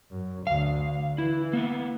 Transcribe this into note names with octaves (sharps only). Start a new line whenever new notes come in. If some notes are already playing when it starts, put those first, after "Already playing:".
F#2
D2 D3 F5
E3 E4
A#3 B3